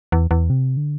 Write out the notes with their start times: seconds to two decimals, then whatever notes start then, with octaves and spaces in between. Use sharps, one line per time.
0.12 E2
0.31 E2
0.50 C3
0.77 D3